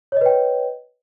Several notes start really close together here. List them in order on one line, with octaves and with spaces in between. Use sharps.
C#5 D#5 B4 G5